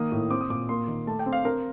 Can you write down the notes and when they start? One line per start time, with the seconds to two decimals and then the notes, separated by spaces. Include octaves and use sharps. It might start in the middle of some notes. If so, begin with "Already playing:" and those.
Already playing: D#3 A#3 D#6
0.12 A2
0.30 C4 D6
0.41 D#6
0.50 A#2 D6
0.69 A#3 C6
0.87 D#3
1.07 A3 A5
1.19 G5
1.26 C4
1.33 F5
1.44 C4 A#4